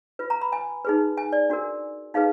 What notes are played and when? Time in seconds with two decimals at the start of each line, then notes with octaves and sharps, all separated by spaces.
0.19 F4 B4
0.30 A#5
0.41 B5
0.52 G#5
0.85 D#4 G#4 B4
1.17 G#5
1.33 D5
1.50 D4 F#4 A#4
2.14 D#4 G#4 B4 F5